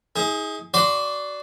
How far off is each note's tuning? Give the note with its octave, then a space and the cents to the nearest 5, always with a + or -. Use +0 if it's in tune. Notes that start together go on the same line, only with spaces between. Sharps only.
D#4 +45 G#4 +0
F#4 +15 D5 -10 C6 -15